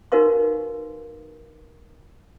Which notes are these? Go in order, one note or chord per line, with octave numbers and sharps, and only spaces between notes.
D#4 F#4 A#4 B4 F5 C#6